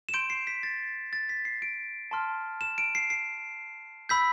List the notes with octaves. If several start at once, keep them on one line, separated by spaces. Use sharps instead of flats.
E7
C6 G6 D7
C7
B6
A6
A6
B6
C7
D7
A5 C6 F6
E7
D7
C7
C7
B5 E6 G6 B6